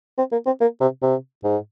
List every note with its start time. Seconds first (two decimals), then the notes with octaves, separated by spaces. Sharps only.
0.18 C4
0.32 A#3
0.46 C4
0.60 A#3
0.81 C3
1.02 C3
1.44 G#2